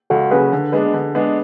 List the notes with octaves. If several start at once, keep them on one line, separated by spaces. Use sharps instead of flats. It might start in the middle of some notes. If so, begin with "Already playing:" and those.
C#2 F#4 A4
C#3 F#3 C#4 G#4 B4
D3
G#3 B3 D4 G#4 B4
D3
G#3 B3 D4